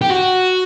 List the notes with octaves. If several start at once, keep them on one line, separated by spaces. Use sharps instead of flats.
G4
F#4